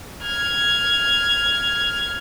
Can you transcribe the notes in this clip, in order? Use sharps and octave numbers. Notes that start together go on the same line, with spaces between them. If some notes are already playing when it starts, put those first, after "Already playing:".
F6 G#6